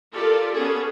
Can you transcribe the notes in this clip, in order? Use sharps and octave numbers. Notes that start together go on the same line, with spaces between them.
F4 G4 A4 A#4 D5
B3 C#4 G#4 A4